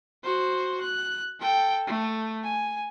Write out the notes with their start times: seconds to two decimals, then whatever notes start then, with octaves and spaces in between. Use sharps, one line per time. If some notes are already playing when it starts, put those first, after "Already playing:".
0.24 F#4 C5
0.81 F#6
1.40 A4 G5
1.87 A3
2.44 G#5